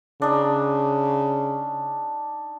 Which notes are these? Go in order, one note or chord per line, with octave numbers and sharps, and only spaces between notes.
C#3 D4 D#4